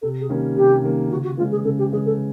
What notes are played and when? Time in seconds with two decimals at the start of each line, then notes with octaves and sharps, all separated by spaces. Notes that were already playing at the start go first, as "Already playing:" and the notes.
0.02 C3 A4
0.21 G#4
0.29 D#3 G3 A#3 C#4
0.56 C3 G4
0.83 D#3 G3 A#3 C#4
1.10 C#3 F#4
1.24 F#4
1.37 E3 G#3 C#4 F4
1.51 G#4
1.64 C#3 A4
1.78 G4
1.92 E3 G#3 C#4 G#4
2.05 A4